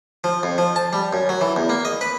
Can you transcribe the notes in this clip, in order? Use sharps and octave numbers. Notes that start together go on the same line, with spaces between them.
F3
F2
F3
A5
G3
F#2
F#3
E3
E2
A#3
D#5
B4